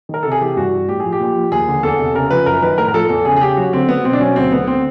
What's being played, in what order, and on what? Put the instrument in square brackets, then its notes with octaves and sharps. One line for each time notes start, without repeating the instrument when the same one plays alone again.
[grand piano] D#3 A#4
C3 A4
G#4
E3 G4
G2 F#4
E3
A2 G4
F3 G#4
G4
A#2
F3
D#2 G#4
D3
E2 A4
C3
C#3 A#4
F3 B4
F#2 A#4
D#3 B4
A2 A#4
A#4
F3 A4
E2 A4
C#3 G#4
G#4
C#3 G4
F#3 F#4
D3 C4
F#3 B3
B2 C4
D4
F#3 C#4
D2 C4
D3 B3
C4